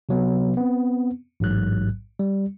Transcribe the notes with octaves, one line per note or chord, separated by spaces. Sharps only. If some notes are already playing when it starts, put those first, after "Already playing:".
C3 F#3 B3
B3 C4
A1 G#2 F#3 F#6
G3